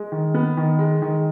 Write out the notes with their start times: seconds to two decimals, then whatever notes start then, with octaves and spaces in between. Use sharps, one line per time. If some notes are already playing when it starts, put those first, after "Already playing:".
Already playing: G#3
0.12 D#3
0.34 B3
0.57 D#3
0.79 G#3
1.02 D#3